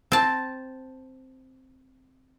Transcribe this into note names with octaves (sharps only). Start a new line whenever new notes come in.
C4 A5